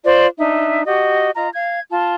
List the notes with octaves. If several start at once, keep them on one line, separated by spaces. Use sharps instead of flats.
F4 C5 D5
D4 D#4 E5
F#4 G4 D#5
F4 D#5 A#5
F5 G#6
F4 A5